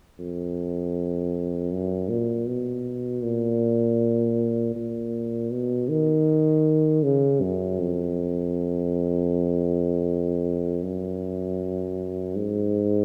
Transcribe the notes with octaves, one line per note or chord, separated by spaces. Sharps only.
F2
F#2
A#2
B2
A#2
A#2
B2
D#3
C#3
F#2
F2
F#2
G#2